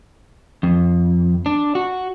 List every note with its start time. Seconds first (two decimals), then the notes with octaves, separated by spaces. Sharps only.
0.63 F2
1.46 D4
1.75 F#4